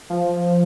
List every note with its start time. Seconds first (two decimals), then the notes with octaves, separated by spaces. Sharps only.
0.10 F3